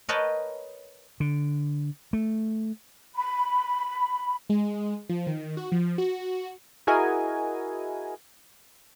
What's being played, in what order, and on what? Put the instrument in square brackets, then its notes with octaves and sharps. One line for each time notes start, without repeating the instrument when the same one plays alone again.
[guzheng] A#4 B4 C#5 D#5 G5 A5
[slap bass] D3
A3
[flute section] B5
[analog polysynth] G#3
F3
D#3
F#4
F3
F#4
[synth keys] E4 F#4 G#4 A#4 D#5 G#5